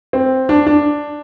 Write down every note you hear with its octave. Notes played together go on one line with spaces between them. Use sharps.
C4
D4
D4